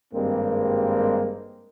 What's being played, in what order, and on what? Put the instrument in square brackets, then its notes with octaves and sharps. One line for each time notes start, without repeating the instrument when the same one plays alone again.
[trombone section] G#1 G2 G3 G#3 A#3 C4